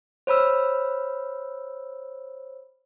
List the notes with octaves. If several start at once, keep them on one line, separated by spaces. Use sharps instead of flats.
C5 C#5 B5 E6 F6